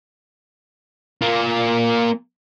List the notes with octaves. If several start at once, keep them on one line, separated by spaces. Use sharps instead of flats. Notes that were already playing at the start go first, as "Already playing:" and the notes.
A#3 F4